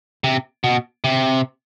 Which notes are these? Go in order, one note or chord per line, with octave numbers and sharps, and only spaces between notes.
C3
B2
C3